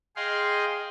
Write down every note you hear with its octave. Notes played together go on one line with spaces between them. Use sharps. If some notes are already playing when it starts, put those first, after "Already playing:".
G#4 D#5 F5 G5 C6